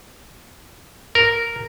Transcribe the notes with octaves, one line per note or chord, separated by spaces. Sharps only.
A#4